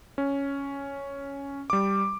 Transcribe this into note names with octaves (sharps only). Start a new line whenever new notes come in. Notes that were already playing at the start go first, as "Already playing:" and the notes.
C#4
G3 D6